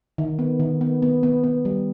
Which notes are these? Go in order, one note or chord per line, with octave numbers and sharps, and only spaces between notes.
D#3
B3
D#3
B3
B3
B3
B3
G3